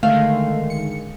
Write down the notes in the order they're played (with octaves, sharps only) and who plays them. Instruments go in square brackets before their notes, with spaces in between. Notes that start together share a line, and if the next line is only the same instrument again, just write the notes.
[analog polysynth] D3 D#3 G#3 [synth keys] A3 [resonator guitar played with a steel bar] F5
[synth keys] C#7